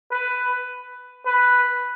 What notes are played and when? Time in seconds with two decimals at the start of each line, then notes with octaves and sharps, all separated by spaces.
0.12 B4
1.26 B4